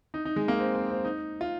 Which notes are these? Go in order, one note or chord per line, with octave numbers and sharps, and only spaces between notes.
D#4
D#4
G#3
A#3
C4
C4
C4
D#4
F4